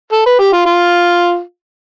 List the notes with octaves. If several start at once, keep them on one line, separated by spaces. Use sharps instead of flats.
A4
B4
G4
F4
F4